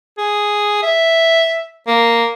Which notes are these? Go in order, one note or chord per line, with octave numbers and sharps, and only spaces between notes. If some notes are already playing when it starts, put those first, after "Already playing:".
G#4
E5
A#3